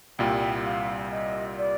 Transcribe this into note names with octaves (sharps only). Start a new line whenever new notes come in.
C2 A#2 G3 G5
F5
D#5
D5